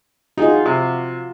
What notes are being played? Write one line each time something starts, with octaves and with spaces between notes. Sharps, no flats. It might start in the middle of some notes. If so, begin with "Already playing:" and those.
D#4 F4 F#4 G#4
C3